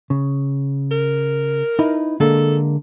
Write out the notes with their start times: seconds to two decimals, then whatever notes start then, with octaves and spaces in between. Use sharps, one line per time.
0.10 C#3
0.91 A#4
1.79 D#4 E4 B4
2.20 D3 G#3 A#3 A4